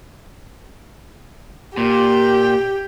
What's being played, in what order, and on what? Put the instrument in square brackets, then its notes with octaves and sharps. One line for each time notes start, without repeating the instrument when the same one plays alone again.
[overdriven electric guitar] A#2 [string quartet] G4